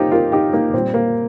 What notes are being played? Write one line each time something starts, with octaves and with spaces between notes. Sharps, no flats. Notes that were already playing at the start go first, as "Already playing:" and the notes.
Already playing: A#3 C4 D#4 F4 G4
F4 A#4
D#4 G4
A#3 D#4
A#2 G3 C4
A#3